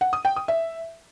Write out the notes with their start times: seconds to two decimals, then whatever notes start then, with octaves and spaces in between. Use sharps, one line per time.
0.01 F#5
0.13 D#6
0.25 G5
0.36 D#6
0.48 E5